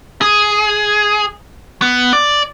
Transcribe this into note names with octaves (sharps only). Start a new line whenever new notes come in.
G#4
B3
D5